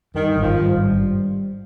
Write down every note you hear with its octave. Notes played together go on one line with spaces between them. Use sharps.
G2 D#3
D#3
G#1
F3
G2
G3
G3